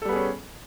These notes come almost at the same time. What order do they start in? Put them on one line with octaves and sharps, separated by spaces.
A4 G3 B3 G#4 C#4